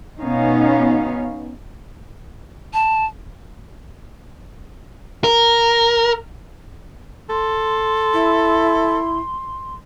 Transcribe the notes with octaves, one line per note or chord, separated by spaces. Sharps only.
B2 B3 C#4 D#4 F5
A5
A#4
A4 C6
E4